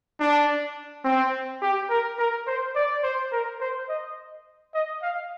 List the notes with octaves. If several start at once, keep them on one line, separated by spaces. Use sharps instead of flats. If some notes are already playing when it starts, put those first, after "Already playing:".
D4
C4
G4
A#4
A#4
C5
D5
C5
A#4
C5
D#5
D#5
F5